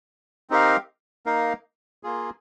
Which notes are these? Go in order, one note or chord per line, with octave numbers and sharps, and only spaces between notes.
C4 D#4 G4 A#4 F5
A#3 D#4 A#4 F5
A#3 F4 G#4